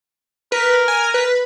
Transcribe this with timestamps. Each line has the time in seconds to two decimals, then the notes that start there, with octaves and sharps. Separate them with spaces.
0.52 A#4 B4
0.88 G#5
1.14 B4